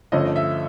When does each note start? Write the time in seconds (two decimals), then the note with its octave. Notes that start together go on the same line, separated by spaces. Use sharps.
0.12 G2 D3 F3 A3 C#4 D#5
0.25 D#5
0.36 E5